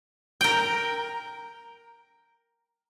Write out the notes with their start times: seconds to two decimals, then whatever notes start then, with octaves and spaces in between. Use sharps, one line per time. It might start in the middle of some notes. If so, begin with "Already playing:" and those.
0.41 A#4 G5